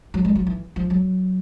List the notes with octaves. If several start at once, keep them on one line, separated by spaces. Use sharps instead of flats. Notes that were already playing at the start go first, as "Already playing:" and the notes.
F#3
G#3
F#3
E3
F3
F#3